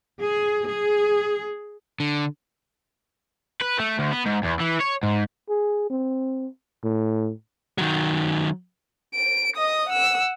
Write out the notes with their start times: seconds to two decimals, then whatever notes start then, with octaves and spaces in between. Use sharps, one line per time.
0.24 G#4
0.68 G#4
2.00 D3
3.61 B4
3.79 A3
3.99 D2
4.12 B3
4.26 G#2
4.44 E2
4.60 E3
4.81 C#5
5.03 G#2
5.49 G#4
5.90 C4
6.84 A2
7.78 D#3 F#3
9.15 D7
9.56 D#5 D#6
9.89 F#5 E6